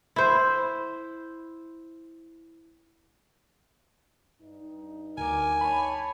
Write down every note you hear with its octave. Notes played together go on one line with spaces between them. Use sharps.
E4 C5
G2 D#4
D2 A#4 G#5 D6
C#5 A5 B5